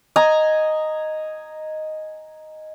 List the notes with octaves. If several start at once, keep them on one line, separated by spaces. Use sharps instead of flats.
D#5 G#5 A#5